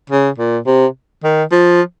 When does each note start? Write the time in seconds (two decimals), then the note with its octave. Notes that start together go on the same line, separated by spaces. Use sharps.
0.10 C#3
0.38 A#2
0.66 C3
1.24 D#3
1.52 F3